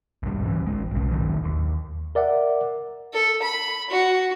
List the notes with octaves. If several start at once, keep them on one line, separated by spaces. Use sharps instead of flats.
C2 G#2 G3
D1 C#2 E3 C#4
G#1 G#3
B1 C#3
G1 A2 D#3 F#3
D#2
A#4 D5 E5 F#5
A4
B5
F#4